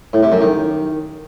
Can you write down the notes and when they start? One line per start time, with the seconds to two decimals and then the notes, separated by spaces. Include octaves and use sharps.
0.13 A2
0.23 C3
0.32 F#2
0.41 D#3